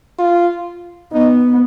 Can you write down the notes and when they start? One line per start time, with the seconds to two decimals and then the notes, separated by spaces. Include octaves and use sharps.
0.19 F4
1.13 B3 D#4